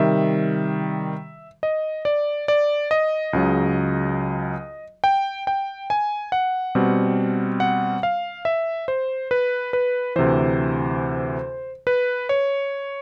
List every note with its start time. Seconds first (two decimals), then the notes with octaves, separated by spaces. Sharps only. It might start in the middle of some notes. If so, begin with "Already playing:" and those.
Already playing: C3 D#3 G3 E5
1.63 D#5
2.05 D5
2.48 D5
2.91 D#5
3.33 C#2 C#3 F#3
5.04 G5
5.47 G5
5.90 G#5
6.32 F#5
6.75 B2 G3 C4
7.60 F#5
8.03 F5
8.45 E5
8.88 C5
9.31 B4
9.73 B4
10.16 D2 C3 E3 C5
11.87 B4
12.29 C#5